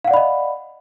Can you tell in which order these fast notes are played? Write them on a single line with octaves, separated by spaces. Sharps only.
F5 F#5 D5 B5 D#5